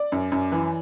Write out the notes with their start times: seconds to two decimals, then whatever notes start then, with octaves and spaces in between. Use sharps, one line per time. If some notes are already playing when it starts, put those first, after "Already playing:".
Already playing: D5
0.12 F#2
0.32 F#2
0.52 E3